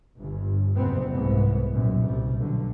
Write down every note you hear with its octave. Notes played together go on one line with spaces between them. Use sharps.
G1 G2
F#1 C2 F2 A#2 B3 C4
C2 G#2 E3 B3
B1 F#2 A#2
C2 G3
B1 D3